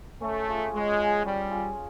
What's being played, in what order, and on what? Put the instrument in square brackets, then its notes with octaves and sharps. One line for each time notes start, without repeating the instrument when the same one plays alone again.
[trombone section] A3 [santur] C#4
[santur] F4 G#4
[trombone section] G#3 [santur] C#4
[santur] F4 G#4
[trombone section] G3 [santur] C#4
[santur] F4 G#4